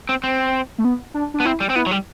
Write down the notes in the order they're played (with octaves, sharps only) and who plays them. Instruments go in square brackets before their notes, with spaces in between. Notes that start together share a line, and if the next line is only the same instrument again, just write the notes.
[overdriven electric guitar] C4
C4
[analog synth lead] A3
B3
D4
D4
[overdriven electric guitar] B3
[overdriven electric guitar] C4 [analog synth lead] E4
[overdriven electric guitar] G3
C4
[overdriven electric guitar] B3 [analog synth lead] E4
[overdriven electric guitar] F#3
G3